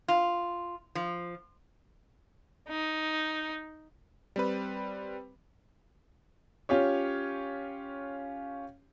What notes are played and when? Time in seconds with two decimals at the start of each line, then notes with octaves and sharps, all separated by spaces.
0.08 F4
0.95 F3
2.68 D#4
4.36 G3 C4 B4
6.69 C#4 F4 G4 C#5